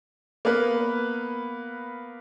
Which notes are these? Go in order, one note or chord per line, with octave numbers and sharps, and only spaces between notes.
A#3 B3 B4